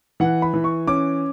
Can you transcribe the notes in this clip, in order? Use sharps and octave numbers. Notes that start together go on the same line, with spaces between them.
E3 F#5
B5
E3
C#6
C#4 D6